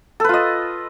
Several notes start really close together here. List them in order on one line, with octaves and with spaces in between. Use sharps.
A4 B4 F4 D#5